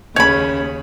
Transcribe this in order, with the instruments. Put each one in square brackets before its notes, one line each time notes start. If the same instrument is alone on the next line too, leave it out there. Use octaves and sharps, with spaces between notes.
[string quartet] D#2 C#3 [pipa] C#5 B5